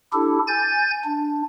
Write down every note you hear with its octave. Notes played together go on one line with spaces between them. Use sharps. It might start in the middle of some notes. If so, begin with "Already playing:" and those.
D4 E4 G4 A4
G#5 G6 A6
D4